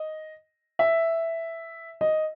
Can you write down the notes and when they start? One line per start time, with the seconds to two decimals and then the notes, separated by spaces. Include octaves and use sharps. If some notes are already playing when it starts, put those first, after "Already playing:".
Already playing: D#5
0.79 E5
2.01 D#5